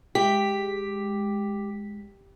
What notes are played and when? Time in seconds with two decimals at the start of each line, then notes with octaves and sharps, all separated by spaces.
0.15 G#3 G4 B6